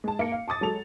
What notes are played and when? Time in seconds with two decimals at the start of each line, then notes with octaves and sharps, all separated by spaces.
0.04 G#3 A5
0.19 A#3 C#7
0.32 F5
0.48 A5 D6 D#6 A6
0.61 F#3 G#3 A4 F7